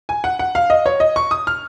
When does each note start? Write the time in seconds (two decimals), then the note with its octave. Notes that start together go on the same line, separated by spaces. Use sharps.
0.09 G#5
0.24 F#5
0.39 F#5
0.55 F5
0.70 D#5
0.86 C#5
1.00 D#5
1.16 C#6
1.31 D#6
1.47 F6